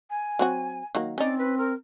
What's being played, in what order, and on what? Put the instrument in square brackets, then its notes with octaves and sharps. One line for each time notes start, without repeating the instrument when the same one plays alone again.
[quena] G#5
[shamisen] F#3 C4 F#4
D#3 F#3 A#3
[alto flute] C4 [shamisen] C#4 D#4 [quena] D5
[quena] B4
A#4